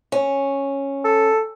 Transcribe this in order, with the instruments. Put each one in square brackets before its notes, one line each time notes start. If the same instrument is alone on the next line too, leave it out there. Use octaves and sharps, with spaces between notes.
[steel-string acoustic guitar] C#4
[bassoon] A4